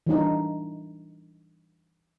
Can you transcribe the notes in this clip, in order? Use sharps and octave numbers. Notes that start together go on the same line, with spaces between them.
E3 G3 D4 D#4